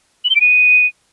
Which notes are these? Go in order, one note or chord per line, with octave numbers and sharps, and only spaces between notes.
F#7
G7
D7
D#7